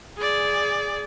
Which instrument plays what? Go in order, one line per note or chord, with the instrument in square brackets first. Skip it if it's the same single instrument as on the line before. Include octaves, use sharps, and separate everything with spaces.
[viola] G#4 D5